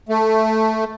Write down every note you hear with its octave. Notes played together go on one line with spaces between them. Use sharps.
A3